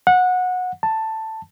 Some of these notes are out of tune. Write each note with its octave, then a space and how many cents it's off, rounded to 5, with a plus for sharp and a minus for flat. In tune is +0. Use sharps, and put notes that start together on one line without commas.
F#5 -20
A5 +10